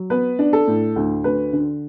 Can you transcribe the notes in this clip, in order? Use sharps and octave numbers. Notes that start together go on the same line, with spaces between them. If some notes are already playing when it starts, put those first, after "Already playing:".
Already playing: F#3
B3 B4
D4
A4
A2
D2
D2 B4
D3